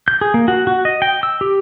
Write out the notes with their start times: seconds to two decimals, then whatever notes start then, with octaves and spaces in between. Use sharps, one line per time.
0.08 G6
0.21 G#4
0.34 A#3
0.48 F#4
0.67 F#4
0.85 D#5
1.02 G5
1.23 E6
1.41 G4